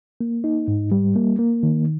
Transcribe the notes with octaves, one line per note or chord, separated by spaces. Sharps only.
A#3
D#4
G#2
G3
A#3
A#3
D#3